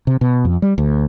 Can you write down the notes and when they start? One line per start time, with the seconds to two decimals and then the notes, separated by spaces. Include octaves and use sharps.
0.07 C3
0.21 B2
0.45 F2
0.62 G3
0.78 D2